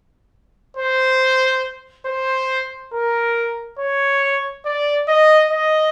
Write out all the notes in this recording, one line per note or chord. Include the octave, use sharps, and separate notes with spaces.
C5
C5
A#4
C#5
D5
D#5
D#5